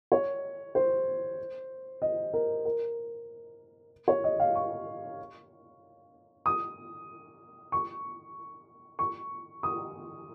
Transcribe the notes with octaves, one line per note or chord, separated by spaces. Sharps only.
C#5
C5
D#5
A#4
A#4
C#5
D#5
F5
C#6
D#6
C#6
C#6
D#6